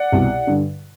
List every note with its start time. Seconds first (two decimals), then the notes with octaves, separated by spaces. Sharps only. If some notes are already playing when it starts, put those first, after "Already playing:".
Already playing: D5 F#5
0.12 C2 B2
0.47 G2 D3